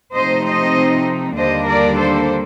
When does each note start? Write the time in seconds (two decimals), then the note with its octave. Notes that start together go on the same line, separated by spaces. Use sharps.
0.14 C3 F3 A3 C4 D#4 C5 D#5
0.46 C5 D#5
1.37 D#2 D3 G3 A#3 D4 C5 D#5
1.68 A#4 D5
1.99 A4 C5